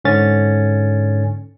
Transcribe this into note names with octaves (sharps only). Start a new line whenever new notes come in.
G#2 D3 C#4 A6